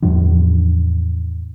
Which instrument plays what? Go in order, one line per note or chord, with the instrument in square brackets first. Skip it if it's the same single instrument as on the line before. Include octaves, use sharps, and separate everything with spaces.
[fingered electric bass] E2 A2 F3 D4